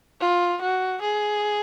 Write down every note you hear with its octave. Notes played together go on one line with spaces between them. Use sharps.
F4
F#4
G#4